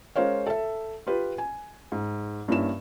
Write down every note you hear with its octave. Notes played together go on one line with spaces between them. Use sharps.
G#3 C#4 A#4 C5 C#5 F5
A4 E5
F4 G4 B4
G#5
G#2
G2 A#3 C#4 E4 E7